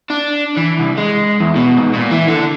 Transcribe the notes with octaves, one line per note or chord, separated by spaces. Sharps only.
D4
E3
C2
G#3
E2
B2
G#2
A#2
E3
D3